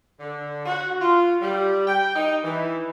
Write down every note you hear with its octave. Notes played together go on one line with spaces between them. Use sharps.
D3
F#4
F4
G3
G5
D#4
E3